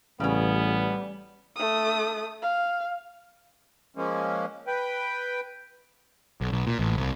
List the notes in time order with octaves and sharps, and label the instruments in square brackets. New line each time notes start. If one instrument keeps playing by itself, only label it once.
[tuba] A1 [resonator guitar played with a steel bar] C#3 C#4 [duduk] G3 [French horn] B3
[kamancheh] A3 D#6
F5
[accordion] F3 G#3 A#3 C#4
B4 G5
[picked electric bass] B1
B1
A#2
A1
C2